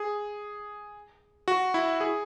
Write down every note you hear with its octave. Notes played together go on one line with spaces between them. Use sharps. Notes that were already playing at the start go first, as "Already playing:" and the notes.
Already playing: G#4
F#4
E4
G#4